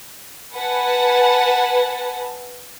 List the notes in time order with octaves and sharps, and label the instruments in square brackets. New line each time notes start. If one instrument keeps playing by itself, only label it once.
[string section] B4 F#5 G#5 A5